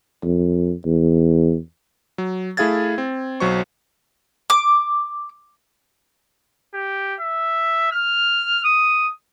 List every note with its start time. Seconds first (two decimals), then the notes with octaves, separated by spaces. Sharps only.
0.24 F2
0.85 E2
2.18 F#3
2.57 A3 E4 G#4 F5 G#6 A6
2.98 C4
3.40 B1 F#3 C5 C#6
4.50 D6
6.74 G4
7.21 E5
7.92 F6
8.64 D#6